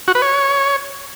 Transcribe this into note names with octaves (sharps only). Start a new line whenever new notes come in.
F#4
B4
C#5